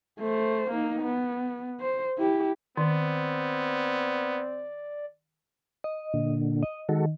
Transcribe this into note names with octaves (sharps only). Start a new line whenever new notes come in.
A3 C5
A#3 D#4
B3
C5
E4 G4
D#3 B3 C4 D5
D#5
A#2 D3
D#5
D#3 G#3 F#4 A4